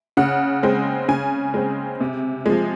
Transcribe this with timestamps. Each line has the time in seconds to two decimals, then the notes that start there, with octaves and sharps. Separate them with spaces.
0.17 C#3 F#5
0.63 G#3 C4
1.08 C#3 G#5
1.54 G#3 C4
2.01 C3
2.46 F3 G#3